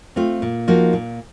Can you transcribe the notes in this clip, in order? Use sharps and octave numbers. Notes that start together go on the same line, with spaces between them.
A3 C4 F4
A#2
F3 A#3 D#4 F#4
A#2